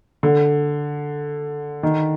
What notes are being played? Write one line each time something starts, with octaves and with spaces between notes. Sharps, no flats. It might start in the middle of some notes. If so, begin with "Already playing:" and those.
D3
D#3